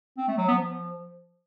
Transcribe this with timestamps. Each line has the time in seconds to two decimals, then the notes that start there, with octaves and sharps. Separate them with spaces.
0.17 C4
0.28 A3
0.38 F#3
0.48 B3
0.58 F3